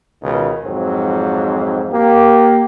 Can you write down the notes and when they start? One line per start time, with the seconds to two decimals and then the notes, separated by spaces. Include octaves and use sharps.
0.23 C#2 B2 D#3
0.64 F2 G#2 F3 F#3 C4
1.92 A#3 G4